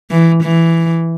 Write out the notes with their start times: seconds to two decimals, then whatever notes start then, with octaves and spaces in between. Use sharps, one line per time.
0.11 E3
0.44 E3